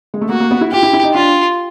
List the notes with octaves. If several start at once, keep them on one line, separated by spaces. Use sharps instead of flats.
G#3
A3
A#3 F#4
A#3
B3
E4
F4 G4
E4
E4
D#4
D4 F4